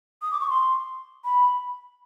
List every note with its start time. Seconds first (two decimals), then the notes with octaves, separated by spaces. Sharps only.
0.22 D#6
0.31 D6
0.40 C#6
0.50 C6
1.25 B5